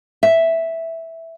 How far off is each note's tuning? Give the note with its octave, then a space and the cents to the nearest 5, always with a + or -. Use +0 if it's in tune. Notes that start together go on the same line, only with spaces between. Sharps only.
E5 -5